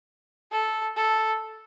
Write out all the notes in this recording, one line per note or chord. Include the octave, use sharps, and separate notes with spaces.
A4
A4